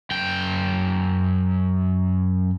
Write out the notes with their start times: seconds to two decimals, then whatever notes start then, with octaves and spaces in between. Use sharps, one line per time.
0.11 F#2 G5